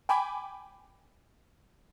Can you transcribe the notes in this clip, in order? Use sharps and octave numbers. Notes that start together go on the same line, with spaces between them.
G5 G#5 B5 D6